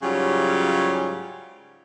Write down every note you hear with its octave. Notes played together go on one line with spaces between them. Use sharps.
G#2 C#3 F#3 G3 F4 G4